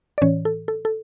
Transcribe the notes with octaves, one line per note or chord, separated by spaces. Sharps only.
D5
A2 E3 C#4 C#5
A4
A4
A4